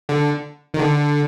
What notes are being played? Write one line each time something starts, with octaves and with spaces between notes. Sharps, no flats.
D3
D#3
D3